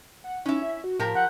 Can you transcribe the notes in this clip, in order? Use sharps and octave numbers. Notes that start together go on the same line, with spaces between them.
F#5
C#4 D#4 E4
E5
F#4
A2 F3 G4 A#4
F#5 G6